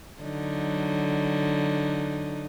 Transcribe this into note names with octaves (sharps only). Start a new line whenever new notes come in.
D3 F#3 D#4